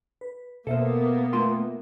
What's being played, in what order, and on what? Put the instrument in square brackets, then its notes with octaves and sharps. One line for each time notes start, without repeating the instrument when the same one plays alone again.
[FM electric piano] B4
[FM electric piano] B2 E5 [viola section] A#3 B3 [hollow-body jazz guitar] A4 C5
[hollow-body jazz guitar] A3 F4 C6